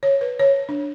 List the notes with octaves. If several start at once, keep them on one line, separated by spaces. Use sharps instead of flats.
C#5
B4
C#5
D4